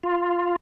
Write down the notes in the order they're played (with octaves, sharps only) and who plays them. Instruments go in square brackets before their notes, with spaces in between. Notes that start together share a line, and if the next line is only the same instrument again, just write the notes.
[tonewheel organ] F4